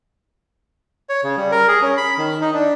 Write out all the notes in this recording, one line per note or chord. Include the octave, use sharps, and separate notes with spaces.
C#5
C#3
G3
A#4
G#4
C#4
B5
D#3
D#4
D4